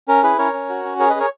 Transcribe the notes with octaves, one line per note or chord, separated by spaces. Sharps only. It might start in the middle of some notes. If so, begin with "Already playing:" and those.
C#4 A#4
E4 G#4 B4
C#4 A#4 C#5
C#4
F#4
C#4
G#4 A#4 C#5
B4 D#5
G#4 A#4 C#5